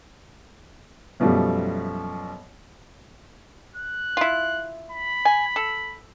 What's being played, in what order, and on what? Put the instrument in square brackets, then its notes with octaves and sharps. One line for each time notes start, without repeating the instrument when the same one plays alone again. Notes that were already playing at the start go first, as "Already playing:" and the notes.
[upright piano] F#2 B2 F3 G3 A3
[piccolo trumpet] F#6
[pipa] E4 F4
[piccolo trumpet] B5
[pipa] G#5
A4